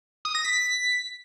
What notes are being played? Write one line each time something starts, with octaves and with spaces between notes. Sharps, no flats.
D#6
A#6
B6